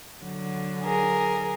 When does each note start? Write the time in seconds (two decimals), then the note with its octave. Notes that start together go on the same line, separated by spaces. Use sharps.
0.23 D3 F#3
0.84 G#4 A#4